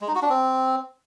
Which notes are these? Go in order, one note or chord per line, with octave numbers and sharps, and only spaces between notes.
G#3
D#4
F#4
D4
C4